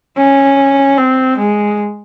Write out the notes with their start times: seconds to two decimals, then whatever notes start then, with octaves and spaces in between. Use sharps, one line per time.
0.17 C#4
0.98 C4
1.38 G#3